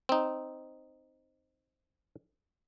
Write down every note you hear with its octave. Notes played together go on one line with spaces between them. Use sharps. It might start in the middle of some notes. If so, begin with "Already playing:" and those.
C4 D#4